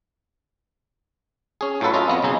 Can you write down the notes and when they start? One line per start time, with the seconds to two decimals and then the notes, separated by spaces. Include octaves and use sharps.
1.61 C#4 G#4
1.81 A2 F#3 F4 A4 B4
1.94 C#4 F4 D#5 E5
2.08 F2 B3 D#5
2.22 B1 C#3 D#4 G#5